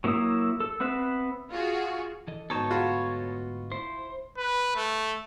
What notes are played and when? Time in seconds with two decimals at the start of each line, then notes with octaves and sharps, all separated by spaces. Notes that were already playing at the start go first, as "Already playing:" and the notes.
0.04 F#3 A#3 E4 E5 D#6
0.60 A4
0.80 B3 C4 B4 E5
1.50 F4 F#4 G#4
2.28 E3 A4 D#5
2.50 D2 G#2 B2 D#4 A4 C#5 A5
2.71 F4 F#4 B5
3.72 E4 C5
4.38 B4
4.76 A3